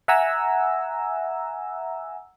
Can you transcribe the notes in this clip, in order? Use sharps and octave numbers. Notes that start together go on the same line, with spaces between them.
E5 F#5 G#5 A#5 E6